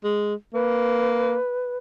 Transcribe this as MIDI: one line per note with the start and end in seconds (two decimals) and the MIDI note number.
0.04 0.34 56
0.54 1.36 58
0.54 1.77 71